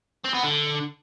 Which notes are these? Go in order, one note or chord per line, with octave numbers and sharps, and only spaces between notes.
C4
B3
D3